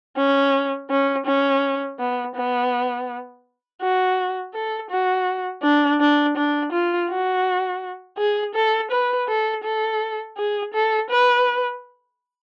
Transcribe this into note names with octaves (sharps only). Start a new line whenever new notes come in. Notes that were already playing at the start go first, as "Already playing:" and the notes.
C#4
C#4
C#4
B3
B3
F#4
A4
F#4
D4
D4
D4
F4
F#4
G#4
A4
B4
A4
A4
G#4
A4
B4